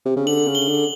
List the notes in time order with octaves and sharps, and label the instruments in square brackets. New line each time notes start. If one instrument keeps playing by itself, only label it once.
[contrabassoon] C3
C#3
[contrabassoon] D3 [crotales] F#7
[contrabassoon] C#3
[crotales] G7
[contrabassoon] D3